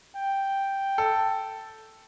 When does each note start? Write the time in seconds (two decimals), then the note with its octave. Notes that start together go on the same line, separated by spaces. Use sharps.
0.17 G5
0.98 A4